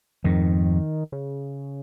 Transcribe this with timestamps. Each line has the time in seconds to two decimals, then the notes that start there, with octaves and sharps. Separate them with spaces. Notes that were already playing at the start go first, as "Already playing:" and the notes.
0.24 F2 G#2 D#3
1.12 C#3